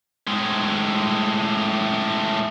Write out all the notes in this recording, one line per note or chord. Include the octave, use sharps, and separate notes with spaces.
A2 G#3